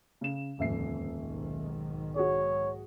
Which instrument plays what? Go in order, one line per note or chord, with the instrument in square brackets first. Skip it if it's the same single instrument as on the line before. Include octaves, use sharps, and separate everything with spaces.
[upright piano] C#3 E7
[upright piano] D#1 E5 C7 [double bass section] F2 G#2 D3
[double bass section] B1 G#2 D#3
[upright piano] F#4 G#4 [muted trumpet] C#5